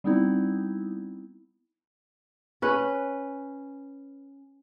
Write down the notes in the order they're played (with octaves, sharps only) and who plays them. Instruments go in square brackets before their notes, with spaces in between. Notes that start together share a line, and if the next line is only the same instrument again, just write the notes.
[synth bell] G3 B3 C4 D#4 E4
[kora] C#4 B4